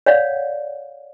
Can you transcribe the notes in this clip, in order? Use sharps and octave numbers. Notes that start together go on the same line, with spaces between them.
C#5 D5 F5 F#5